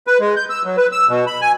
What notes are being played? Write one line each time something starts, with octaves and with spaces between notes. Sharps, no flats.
B4
G#3
G6
E6
F#3
B4
E6
B2
B5
G#5